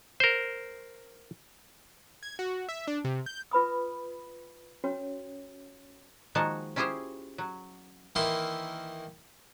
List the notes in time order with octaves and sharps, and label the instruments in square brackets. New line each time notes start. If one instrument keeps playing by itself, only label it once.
[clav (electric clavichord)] A#4 C5
[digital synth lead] G#6
F#4
E5
D4
C3
G6
[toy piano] F4 B4 B5 D#6
C#4 F#4 C#5
[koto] D#3 F3 G#3 A#3 F#4 A5
C#4 E4 F4 G4 G#4 C5
F#3
[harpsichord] D#3 E3 A#3 E4 E5 C6